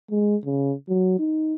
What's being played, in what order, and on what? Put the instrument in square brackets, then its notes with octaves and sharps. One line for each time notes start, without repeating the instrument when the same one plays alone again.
[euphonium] G#3
C#3
F#3
D#4